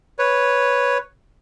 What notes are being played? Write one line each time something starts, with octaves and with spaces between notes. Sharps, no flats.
B4 C#5